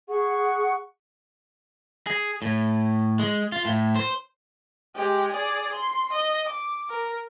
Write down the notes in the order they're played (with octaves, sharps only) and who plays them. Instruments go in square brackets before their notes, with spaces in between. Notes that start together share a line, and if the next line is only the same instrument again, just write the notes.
[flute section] G#4 F#5 C#6
[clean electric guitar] G#4
A2
G#3
F4
A2
C5
[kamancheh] G#3 G4
G#4 D5
C6
D#5
D6
A#4